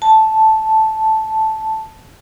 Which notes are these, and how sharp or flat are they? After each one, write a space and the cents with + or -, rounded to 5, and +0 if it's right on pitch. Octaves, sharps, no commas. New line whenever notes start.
A5 -5